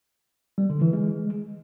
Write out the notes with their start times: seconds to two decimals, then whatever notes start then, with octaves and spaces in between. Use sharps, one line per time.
0.58 G3
0.70 D3
0.82 E3
0.93 G#3